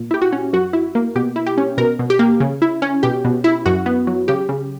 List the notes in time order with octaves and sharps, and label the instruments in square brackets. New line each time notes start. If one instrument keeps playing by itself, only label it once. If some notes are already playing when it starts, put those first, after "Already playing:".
Already playing: [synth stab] A#2
E4 G4
F#4
C#4
F#2 F#4
E4
A#3
B2 G4
E4
G4
C#4
B2 A#4
B2
G4
A#3
C#3
E4
C#4
B2 G4
B2
E4
F#2 F#4
B3
F#3
C#3 G4
C#3